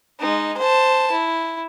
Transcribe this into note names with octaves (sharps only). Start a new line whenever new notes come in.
G#3 D#4
C5 A5
E4